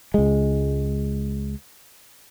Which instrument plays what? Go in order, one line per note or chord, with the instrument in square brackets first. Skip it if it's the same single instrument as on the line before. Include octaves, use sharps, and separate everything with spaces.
[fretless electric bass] C#2 G#3